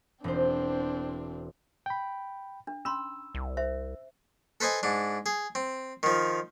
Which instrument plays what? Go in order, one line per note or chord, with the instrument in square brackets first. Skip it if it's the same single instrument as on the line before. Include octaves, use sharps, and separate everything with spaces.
[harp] E1 C5 [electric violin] C4 D4
[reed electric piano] G5 B5
[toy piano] D4
[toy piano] C#4 B5 C6 [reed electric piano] E6
[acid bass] C2
[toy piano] C5 E5
[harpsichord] A4 B4 C5 D#5 G#5
G#2 D4
G#4
C4
D#3 F3